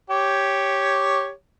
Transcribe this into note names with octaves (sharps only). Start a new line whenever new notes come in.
G4 C#5